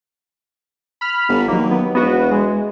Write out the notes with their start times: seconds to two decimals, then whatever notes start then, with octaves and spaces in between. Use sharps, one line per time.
1.01 B5 F6
1.29 G1
1.48 D#2 F#3 A#3
1.71 B3
1.95 E1 B3 F#4
2.32 G#3